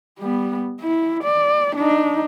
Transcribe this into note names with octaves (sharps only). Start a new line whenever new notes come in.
G3 B3
E4
D5
D4 D#4